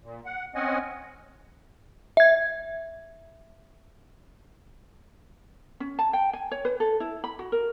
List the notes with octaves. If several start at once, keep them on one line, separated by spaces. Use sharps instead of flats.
A#2
F#5
C4 C#4 D#5 F#5 G#5
E5 G#6
C#4
A5
G5
G#5
C#5
B4
A4
E4
B5
F#4
A#4